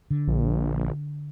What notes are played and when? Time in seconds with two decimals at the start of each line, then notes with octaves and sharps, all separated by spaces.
0.10 D3
0.28 A#1